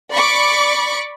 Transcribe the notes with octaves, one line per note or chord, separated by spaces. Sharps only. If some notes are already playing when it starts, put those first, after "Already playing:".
D5 B5 C#6 D6 C#7